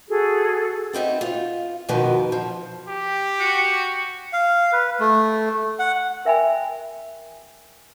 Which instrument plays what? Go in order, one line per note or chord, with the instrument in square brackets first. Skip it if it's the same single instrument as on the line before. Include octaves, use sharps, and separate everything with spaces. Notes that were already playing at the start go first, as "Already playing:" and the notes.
[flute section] F#4 G#4 A4
[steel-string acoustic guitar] B3 C4 D#4 E5
F4
F2 B2 D#3 F3 B3
F3
[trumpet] G4
[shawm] F#4
[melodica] F5
B4
A3
F#5
[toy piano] A#4 E5 G5 G#5 B5